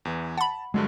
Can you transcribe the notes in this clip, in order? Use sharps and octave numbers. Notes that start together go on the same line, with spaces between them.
E2 E3
F#5 A5 B5
G2 D3 F#3 G#3